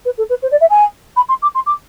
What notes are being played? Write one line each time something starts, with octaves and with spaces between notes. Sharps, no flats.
B4
A4
B4
C5
D5
E5
G#5
B5
C6
D6
C6
D6